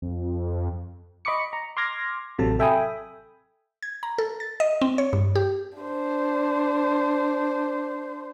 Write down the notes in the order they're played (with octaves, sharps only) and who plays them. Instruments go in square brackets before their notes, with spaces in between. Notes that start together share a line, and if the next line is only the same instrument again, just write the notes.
[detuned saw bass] F2
[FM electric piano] D#5 B5 C#6 D6 C#7
A#5
C6 D6 F6 G#6 A#6
A1 C3 F#3 A4 A5
A4 E5 G5 G#5 B5 D#6
[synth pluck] G#6
A#5
A4
A6
D#5
C4
C#5
G2
G4
[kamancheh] D4 C5